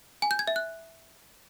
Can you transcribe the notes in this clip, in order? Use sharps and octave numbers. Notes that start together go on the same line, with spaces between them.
G#5
G6
G#6
E5
F#6